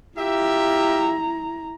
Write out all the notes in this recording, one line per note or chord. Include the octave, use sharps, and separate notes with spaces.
E4 F4 G4 E5 A#5